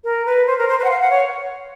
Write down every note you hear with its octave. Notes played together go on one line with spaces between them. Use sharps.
A#4
B4
C5
A#4
C5
B4
F#5
F5
F#5
C#5